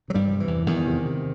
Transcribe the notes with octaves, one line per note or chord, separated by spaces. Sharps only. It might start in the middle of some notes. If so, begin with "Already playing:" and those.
C3 F#3
G2 G3
C3
E3
E2
E2 D#3
C3
C3